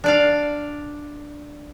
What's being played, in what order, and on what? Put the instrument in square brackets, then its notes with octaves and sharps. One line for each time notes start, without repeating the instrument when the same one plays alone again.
[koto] D4 D5 F5